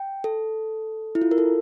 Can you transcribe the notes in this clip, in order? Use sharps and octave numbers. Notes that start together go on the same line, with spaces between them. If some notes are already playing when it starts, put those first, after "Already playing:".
Already playing: G5
A4
E4
F4
A#4
A4